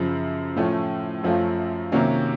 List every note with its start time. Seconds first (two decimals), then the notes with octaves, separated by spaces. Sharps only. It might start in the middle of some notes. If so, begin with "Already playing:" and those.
Already playing: F#2 C#3 F3
0.56 A2 F3 A3 C#4
1.24 F#2 F3 A3 C#4 F4
1.92 C3 D#3 F#3 A#3 C#4